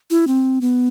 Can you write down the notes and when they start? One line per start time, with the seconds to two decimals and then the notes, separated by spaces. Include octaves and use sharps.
0.10 E4
0.27 C4
0.61 B3